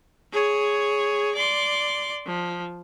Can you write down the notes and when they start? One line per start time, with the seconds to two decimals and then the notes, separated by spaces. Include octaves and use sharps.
0.32 G#4 C#5
1.35 D5 C6
2.26 F3